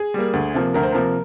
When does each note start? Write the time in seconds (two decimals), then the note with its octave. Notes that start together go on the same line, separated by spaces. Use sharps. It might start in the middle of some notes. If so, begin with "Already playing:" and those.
Already playing: G#4
0.14 G3 A#3
0.33 D2
0.54 C3 F3 A#3
0.74 D2 A#4
0.83 C5
0.92 C3 F3 A#3 A#4